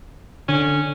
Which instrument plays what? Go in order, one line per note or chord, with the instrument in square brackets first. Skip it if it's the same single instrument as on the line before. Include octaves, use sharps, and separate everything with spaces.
[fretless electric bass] D3 [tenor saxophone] C#4